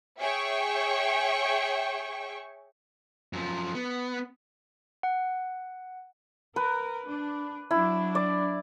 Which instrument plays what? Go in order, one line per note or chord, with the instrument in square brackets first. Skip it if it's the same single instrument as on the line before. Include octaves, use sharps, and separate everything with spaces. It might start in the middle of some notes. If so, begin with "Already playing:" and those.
[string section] G#4 C#5 E5 G5 C#6
[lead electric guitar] F#2 F3
B3
[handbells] F#5
[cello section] A#4 [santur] B4
[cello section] D4
[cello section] F#3 D4 [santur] E4
[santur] D5